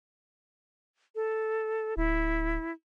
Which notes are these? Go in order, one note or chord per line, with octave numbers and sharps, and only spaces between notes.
A4
D1 E4